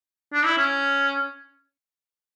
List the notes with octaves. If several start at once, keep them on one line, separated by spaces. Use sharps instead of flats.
D4
E4
C#4